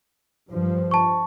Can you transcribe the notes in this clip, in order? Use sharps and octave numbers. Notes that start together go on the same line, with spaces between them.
G2 F3
A5 C#6